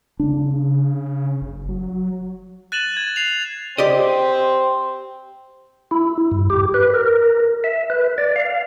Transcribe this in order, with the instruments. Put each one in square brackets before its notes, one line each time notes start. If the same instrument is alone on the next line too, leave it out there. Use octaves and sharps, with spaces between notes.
[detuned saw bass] C#3 [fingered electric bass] D4
[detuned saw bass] F#1
F#3
[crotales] F#6 A6 D#7 E7 F#7
G#6
C7 F7
[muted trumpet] C4 [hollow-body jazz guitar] G4 D5 D#5
[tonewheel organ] E4
G2
G4
B4
A#4
E5
B4
D5
F5